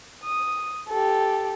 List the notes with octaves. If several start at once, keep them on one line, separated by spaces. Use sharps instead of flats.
D#6
G4 A4